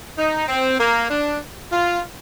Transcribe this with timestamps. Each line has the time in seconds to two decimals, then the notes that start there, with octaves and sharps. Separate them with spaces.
0.17 D#4
0.48 C4
0.78 A#3
1.09 D4
1.71 F4